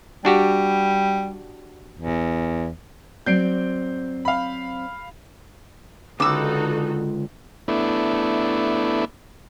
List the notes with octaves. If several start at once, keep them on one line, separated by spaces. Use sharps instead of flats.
G3 D4 F#4 G4
E2
F#3 C4 D5 G6 C7 D7
F5 B5
C#2 D3 D#4 F#4 A4 D6 E6
A3 B3 D4 E4